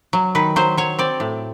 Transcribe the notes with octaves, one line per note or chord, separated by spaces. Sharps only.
F#3
D#3 B4
F#3 C5
F#3 C#5
C4 D5
A2